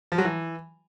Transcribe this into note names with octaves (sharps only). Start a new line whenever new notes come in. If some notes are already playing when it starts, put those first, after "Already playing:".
F3
F#3
E3